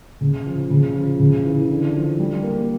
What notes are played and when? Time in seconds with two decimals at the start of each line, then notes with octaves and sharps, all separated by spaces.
0.21 C#3
0.46 F3
0.70 C#3
0.95 F3
1.20 C#3
1.45 E3
1.70 D3
1.94 F3
2.19 G3
2.43 A#3